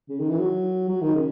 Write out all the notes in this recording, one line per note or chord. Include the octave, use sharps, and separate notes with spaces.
C#3
D#3
E3
F#3
F#3
D#3
C#3